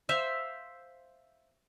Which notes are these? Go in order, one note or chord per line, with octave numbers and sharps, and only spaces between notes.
C5 E5 F5